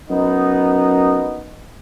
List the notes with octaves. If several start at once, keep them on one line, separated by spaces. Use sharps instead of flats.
F#2 B3 D#4